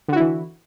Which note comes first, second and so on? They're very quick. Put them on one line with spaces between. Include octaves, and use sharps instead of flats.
D3 F#4 E4 E3